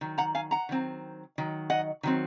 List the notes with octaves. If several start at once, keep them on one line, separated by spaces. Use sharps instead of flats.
D#3 F#3
F#5 A#5
F5 G#5
F#5 A#5
D#3 F#3 C4
D#3 F#3
D#5 F#5
D#3 F#3 C4